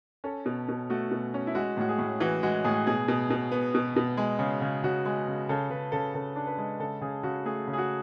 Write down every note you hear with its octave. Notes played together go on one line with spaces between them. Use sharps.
C#4 A4
B2
B2
A3 F#4
B2
C#4
E4
G#3 F#4
A2 F#4
G#4
A2
E3 F#4
G#3 F#4
A2 G#4
B2 G#4
B2
B2
B3
B2
B2
G#3
C#3
C#3
C#3 F#4
G#3
C#3
C#3 A4
C#3 B4
C#3 A4
C#3 A4
D4
B4
G#3
C#3 A4
C#3 G#4
C#3 F#4
A3 G#4
C#3
G#4
F#4